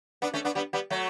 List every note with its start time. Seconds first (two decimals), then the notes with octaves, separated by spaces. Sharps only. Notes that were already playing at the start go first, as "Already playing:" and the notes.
0.22 B3 D4
0.34 A3 C#4
0.45 B3 D4
0.55 G3 B3
0.73 G3 B3
0.90 F#3 A3